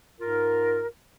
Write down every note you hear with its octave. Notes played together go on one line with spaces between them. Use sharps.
G#2 F4 A#4